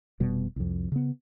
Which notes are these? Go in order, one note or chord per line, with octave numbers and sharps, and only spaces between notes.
F1 B2 G3
C2 F2
C#3 B3